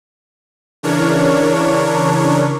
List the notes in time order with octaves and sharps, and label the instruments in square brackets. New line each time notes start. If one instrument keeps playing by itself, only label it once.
[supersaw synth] C#3 E3 D4 A#4 C#5